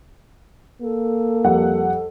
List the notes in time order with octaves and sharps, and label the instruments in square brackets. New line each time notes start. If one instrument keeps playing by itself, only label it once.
[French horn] A#3 [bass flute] A4
[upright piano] F2 G3 F#5